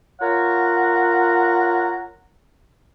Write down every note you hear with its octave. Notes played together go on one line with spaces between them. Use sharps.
F4 A#4 C#5 F#5 A#5